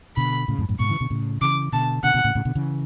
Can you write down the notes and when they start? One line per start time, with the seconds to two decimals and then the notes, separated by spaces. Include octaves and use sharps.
0.17 B2 D3 B5
0.48 A2 C#3
0.59 F#2 A2
0.69 F#2 A2
0.79 G#2 B2 C#6
0.89 C#3 E3
1.01 B2 D3
1.10 A2 C#3
1.41 C#3 E3 D6
1.73 B2 D3 A5
2.03 B2 D3 F#5
2.14 B2 D3
2.24 A2 C#3
2.35 A2 C#3
2.45 B2 D3
2.55 C#3 E3